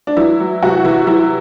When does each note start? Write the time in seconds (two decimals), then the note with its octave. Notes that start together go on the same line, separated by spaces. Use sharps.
0.07 D4
0.17 E3 F#3 E4
0.40 F#3
0.62 C3 F#3 F#4
0.84 C3 E3 E4
1.07 E3 F#3 E4